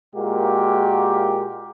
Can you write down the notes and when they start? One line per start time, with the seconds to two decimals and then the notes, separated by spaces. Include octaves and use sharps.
0.15 A#2 G#3 A#3 F#4 G4